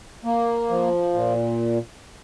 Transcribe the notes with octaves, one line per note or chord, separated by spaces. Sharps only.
A#3
F3
A#2